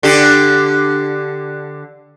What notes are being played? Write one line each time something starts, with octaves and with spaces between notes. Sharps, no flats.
D3 G4